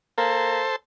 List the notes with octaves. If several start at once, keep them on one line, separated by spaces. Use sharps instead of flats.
A#3 A4 C5